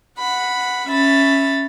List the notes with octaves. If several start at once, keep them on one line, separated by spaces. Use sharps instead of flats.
F#5 B5
C#4 E5 B5 A6